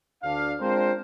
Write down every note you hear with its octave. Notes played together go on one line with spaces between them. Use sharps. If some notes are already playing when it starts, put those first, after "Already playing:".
D2 D4 F5
G#3 C4 D4 F4 A#4 C5